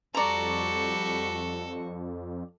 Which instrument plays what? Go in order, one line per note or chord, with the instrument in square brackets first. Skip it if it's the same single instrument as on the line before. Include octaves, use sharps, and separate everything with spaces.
[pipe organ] F2 [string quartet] G3 F#4 C#6 [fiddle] A4 [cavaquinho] D5 A#5